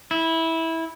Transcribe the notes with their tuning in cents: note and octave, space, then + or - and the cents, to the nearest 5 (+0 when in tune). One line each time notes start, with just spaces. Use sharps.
E4 -15